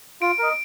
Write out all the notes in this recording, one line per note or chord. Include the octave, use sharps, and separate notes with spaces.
F4 D7
A#4 D#5